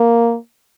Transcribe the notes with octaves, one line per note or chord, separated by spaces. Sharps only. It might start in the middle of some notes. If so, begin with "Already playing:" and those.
Already playing: A#3